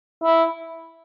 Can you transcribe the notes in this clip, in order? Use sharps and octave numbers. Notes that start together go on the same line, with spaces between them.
E4